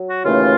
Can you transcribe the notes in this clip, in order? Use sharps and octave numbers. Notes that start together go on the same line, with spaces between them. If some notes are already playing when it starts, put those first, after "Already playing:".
Already playing: F#3
F#4
D#2 C#3 E3 A3 C#4 F4